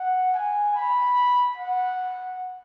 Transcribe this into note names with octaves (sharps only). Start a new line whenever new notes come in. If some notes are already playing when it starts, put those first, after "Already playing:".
Already playing: F#5
G#5
B5
F#5